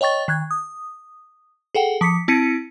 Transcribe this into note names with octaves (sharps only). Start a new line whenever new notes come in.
C#5 D#5 G5 C#6 A6
D#3 F#6 G#6
D#6
G#4 A4 F#5 G5
F3 D6 B6 C#7
C4 E4 A5 B6 C#7 D#7